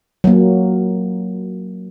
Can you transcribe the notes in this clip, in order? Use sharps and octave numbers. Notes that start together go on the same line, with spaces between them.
F#3 A#3